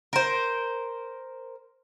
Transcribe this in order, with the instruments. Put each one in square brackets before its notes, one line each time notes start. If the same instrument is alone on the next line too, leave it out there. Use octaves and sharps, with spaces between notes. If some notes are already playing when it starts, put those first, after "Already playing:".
[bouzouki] A#4 C5